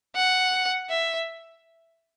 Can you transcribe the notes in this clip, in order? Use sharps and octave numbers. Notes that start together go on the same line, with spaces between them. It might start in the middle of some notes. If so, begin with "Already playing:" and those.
F#5
E5